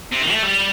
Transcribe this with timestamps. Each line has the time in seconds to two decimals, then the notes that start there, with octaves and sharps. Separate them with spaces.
0.12 C3
0.21 D#3
0.32 A3
0.43 G3